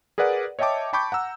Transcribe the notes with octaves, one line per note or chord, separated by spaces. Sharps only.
G#4 A#4 B4 D5 F#5
C#5 D#5 E5 G5 A5 D6
G5 A5 B5 C#6 D6 G6
F#5 A#5 E6